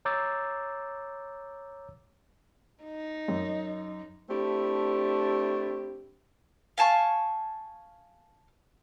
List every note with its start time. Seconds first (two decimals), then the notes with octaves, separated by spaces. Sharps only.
0.05 C#5 A#5 D6 E6 G6 A6
2.84 D#4
3.28 F#2
4.30 A3 C4 D4 E4 G4
6.78 F5 G#5 A5 C#6